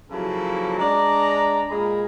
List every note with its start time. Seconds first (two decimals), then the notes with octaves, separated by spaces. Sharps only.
0.10 C#3 F3 F#3 A#3 E4 A4
0.78 G#3 D4 D5 A#5
1.69 A#2 G#3 G#4 A#4 A#5 B5